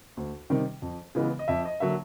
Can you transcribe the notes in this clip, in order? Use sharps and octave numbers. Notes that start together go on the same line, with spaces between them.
D2
C3 D#3 G3
F2
C#3 E3 G#3 B3
D#5
F2 E5
D#5
D3 F#3 A#3 E5